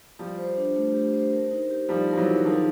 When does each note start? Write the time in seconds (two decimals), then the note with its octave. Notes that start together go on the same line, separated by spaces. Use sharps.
0.19 F3 G3 G4
0.38 C5
0.57 D4
0.76 A3
0.94 G4
1.14 C5
1.33 A#4
1.51 D#4
1.71 G4
1.88 F3 G3 D#4
2.08 A#4
2.13 F3
2.17 E3 F#3
2.27 D#4
2.45 D#3 F3 G#4